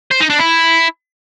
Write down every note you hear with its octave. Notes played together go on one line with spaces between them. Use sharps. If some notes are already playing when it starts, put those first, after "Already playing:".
C5
D#4
D4
E4